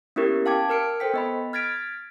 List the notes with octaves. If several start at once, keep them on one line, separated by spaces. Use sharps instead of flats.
A#3 B3 C#4 E4 G4 A#4
F5 G5 A5 D6 G#6
A#4 F6 C#7 D7
A4 C5 G5 B6
B3 D#5 B5
F6 G#6 A6 B6 D7